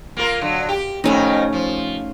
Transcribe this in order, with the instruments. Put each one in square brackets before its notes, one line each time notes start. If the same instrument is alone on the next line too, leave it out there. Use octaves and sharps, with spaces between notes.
[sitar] A#3 F4 A#4
D3 F#3
G4
[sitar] F2 D#3 B3 [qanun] A3 C#4 D#4
[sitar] F3